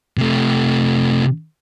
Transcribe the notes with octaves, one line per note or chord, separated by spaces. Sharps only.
C3 A3